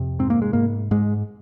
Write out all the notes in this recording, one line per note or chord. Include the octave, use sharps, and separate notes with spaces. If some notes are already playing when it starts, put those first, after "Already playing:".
Already playing: F2 C3
G#2 C4
A#3
G#3
G#2 A#3
G#2 G#3